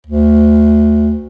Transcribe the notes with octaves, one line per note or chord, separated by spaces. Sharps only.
D2